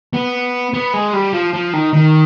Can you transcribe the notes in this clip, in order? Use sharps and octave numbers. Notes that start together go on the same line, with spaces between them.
B3
B3
G#3
G3
F3
F3
D#3
D#3